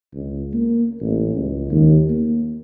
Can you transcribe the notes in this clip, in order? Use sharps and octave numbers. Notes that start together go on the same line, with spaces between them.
C#2
A#3
A1
C#2
D#2
A#3